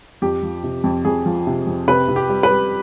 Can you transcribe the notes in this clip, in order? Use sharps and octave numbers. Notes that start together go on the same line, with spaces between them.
F2 G4
F3
C3
F2
F2 G#4
F3
C3
F2
C3 B4
C3
G4
G3
B4
G3